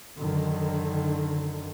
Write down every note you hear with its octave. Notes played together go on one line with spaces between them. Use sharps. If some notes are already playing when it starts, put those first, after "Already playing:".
F#2 D3 D#3